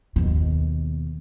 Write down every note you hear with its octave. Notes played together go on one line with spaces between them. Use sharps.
D#2 B2